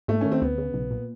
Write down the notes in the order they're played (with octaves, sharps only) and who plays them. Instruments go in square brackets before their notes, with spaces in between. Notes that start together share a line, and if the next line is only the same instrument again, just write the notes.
[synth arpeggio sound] G#2 [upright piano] A3
[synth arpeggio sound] D#3 [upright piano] C#4
[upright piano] C4
[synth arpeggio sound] D2 [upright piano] B3
[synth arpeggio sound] C#3
B1
A#2